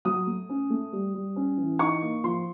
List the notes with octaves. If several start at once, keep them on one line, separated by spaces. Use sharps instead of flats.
F#3 D#6
A3
C#4
A3
G3
G3
C#4
E3
D#4 C#6
A#3
F3 C6